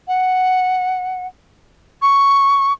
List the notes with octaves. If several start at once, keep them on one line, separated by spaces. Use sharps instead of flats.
F#5
C#6